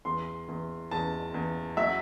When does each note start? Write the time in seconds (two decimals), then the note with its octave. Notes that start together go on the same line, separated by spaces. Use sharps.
0.05 E2 C6
0.48 E2
0.91 E2 A5
1.34 E2
1.77 F#3 E5